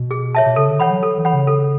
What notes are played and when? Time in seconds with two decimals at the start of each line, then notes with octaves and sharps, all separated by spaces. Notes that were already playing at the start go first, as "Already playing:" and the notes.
Already playing: B2
0.11 G#4
0.35 C#5 E5 A5
0.46 B2
0.56 C#3 A4
0.68 D3
0.79 E3 C#5 F#5 B5
0.90 F#3
1.03 A4
1.18 E3
1.25 C#5 F#5 B5
1.33 C#3
1.47 A4